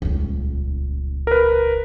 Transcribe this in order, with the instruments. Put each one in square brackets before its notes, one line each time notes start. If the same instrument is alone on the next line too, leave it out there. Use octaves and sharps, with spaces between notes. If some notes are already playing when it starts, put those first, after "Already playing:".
[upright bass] D#1 C#2
[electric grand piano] A#4 B4